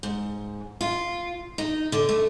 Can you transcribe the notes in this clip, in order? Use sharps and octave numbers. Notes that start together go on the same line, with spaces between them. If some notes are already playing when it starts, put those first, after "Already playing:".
G#2
F4
D#4
D3
A3